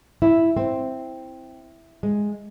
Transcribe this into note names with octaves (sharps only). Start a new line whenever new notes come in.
E4
C4
G#3